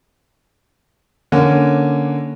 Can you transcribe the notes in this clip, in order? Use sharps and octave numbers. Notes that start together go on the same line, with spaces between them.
D3 A#3 C#4